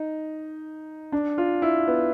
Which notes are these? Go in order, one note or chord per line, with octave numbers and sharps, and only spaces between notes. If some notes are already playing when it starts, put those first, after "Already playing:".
Already playing: D#4
D4
F4
E4
B3